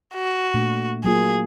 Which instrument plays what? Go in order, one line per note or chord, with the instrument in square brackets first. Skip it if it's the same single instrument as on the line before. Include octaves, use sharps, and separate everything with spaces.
[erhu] F#4
[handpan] A#2 A3 D4
[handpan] F#3 A#3 F4 [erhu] G#4